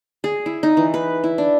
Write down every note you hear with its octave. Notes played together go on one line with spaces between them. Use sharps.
G#4
E4
D#4
E3
B4
E4
D4